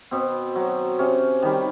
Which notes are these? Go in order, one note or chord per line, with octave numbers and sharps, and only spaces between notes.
B2 C4
F#3
C3 C#4
D#3 G3